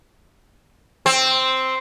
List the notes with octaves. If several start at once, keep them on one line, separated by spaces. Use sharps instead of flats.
C4